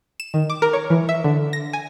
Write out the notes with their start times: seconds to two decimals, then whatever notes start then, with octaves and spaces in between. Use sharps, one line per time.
0.20 E7
0.34 D#3
0.50 D6
0.62 A#4
0.73 C#5
0.90 E3
1.09 E5
1.24 D3
1.53 A#6
1.73 G#5